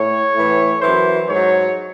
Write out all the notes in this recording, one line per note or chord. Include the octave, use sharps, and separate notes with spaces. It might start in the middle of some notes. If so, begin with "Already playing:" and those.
Already playing: A2 C#5
A2 E3
E3 C5
F#2
G#2 F#3 C#5